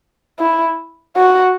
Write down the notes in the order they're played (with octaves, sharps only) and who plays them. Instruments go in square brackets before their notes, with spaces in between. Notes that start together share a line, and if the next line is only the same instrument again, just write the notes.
[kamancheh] E4
F#4